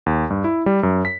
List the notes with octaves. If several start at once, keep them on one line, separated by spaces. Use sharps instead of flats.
D#2
G2
E4
G3
F#2
B6